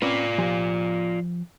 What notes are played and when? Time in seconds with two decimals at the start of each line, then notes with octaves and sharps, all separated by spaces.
0.02 C4 C#4 F4 B4 D5
0.38 F3 G4 G#5